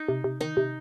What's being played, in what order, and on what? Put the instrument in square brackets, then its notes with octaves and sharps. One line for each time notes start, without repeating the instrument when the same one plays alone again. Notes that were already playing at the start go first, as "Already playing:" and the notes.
Already playing: [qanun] D#4
[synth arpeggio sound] C3
C3
[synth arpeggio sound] D#3 [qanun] D#4
[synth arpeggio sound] C3